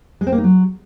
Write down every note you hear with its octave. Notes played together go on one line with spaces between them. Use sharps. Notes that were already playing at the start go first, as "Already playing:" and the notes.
G#3
C4
A#3
D#4
F#3